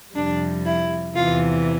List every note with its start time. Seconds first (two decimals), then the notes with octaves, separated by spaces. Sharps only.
0.15 F2 C3 G3 D4
0.65 E4
1.15 E2 C3 E3 F4